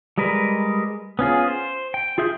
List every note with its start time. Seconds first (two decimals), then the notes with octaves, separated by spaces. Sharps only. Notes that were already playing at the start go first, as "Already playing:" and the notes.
0.18 G3 G#3 A#4 B4
1.19 B3 C#4 F4 G#4
1.48 C5
1.94 G5
2.18 F4 G#4 E5 G6